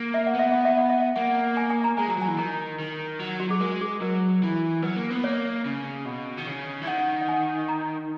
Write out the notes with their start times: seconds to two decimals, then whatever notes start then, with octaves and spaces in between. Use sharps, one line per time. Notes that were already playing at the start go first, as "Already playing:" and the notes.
Already playing: A#3
0.14 E5
0.27 F#5
0.34 B3 E5
0.52 F#5
0.65 E5
0.78 F#5
0.90 E5
1.16 A#3 F#5
1.57 G#5
1.70 G#5
1.84 A#5
1.97 G#3 G#5
2.08 F#3 A#5
2.18 F#3 G#5
2.28 E3
2.38 D#3 A#5
2.80 D#3
3.20 F#3
3.40 F#4
3.49 F#3 G#4
3.61 G#3 A#4
3.81 G#4
4.02 F#3 A#4
4.43 E3
4.83 F#3 B4
4.97 A#3
5.10 B3
5.24 A#3 C#5
5.65 C#3
6.05 B2
6.38 D#3
6.47 C#3
6.82 E3
6.87 D#3 F#5
7.21 F#5
7.29 G#5
7.69 A#5